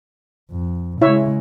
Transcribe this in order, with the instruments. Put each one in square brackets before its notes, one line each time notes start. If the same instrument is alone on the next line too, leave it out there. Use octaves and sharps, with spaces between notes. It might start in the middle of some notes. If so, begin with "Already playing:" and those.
[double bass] F2
[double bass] C#3 G#3 [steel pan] E4 C#5 E5